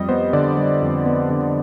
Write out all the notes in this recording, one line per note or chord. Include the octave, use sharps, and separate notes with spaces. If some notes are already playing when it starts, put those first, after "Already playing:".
Already playing: F2 G3 D#5
B3 C5
D3 D5
G3
F2
B3
D3